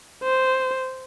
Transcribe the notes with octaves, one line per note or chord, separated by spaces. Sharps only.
C5